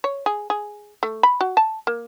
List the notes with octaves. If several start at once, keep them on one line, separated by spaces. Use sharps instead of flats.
C#5
G#4
G#4
A3
B5
F#4
A5
A#3